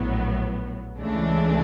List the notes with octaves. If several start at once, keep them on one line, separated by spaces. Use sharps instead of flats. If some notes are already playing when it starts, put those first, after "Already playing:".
Already playing: A#1 A2 F#3 B3
C#2 C#3 E3 A3 D4